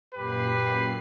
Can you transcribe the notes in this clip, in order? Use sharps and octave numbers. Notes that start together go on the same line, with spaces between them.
F#2 A#2 G4 B4 C7